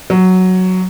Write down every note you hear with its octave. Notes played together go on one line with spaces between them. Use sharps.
F#3